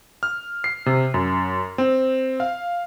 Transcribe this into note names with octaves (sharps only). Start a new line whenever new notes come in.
F6
C7
C3
F#2
C4
F5